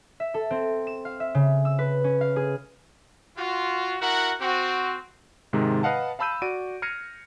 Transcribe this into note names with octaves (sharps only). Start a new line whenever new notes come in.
E5
A4
C4
E7
F5
E5
C#3
E6
B4
C#4
F5
G#4
F4 F#4
E4 F#4 A#4 F#5
C4 F#4
G#2 C3 D#3 G#3
B4 D#5 F5 F#5 A5
F5 A5 B5 E6 G6 D#7
F#4 D5 D7 D#7
F6 G#6 A#6 C7 C#7 D#7